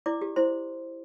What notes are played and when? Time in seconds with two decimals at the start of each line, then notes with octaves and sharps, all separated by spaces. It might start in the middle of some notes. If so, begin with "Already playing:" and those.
0.06 E4 D5 D6
0.21 G4
0.36 E4 C5 C6